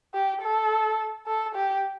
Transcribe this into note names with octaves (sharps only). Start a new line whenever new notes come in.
G4
A4
A4
G4